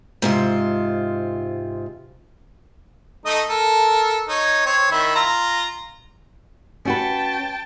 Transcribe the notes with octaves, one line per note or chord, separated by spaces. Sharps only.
G#2 C3 F4
A3 D#4 D#5
A4 A#4
D#4 C#5
C4 C#5
D#3 E4 E5
F4 A#5
C#4 F#4 B4 G5 A5